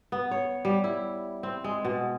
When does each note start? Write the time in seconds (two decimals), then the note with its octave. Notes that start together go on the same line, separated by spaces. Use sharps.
0.12 B3
0.31 C#5
0.65 G3
0.84 E4
1.43 C4
1.64 G#3
1.85 B2